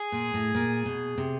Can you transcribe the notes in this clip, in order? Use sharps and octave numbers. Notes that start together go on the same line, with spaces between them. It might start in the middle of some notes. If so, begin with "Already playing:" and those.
Already playing: G#4
A#2
A2
A#2
B2
C3